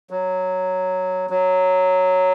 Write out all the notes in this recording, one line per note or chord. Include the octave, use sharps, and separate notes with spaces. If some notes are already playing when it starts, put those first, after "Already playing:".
F#3
F#3